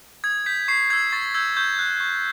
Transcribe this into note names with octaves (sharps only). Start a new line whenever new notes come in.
D#6 G#6
G6 B6
C#6 C7
E6 G6 G#6
C#6 A6
E6 G6 G#6
C#6 G6
F#6
C#6